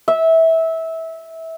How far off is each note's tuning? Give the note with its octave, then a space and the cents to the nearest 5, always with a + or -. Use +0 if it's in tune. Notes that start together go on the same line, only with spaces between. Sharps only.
E5 -20